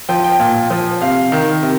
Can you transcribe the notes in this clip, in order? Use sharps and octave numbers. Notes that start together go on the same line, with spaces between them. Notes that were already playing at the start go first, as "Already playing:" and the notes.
F3 G5
G5
A#2
F3
C3 F5
D#3
C3